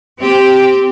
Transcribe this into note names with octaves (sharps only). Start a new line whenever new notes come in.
C4 G4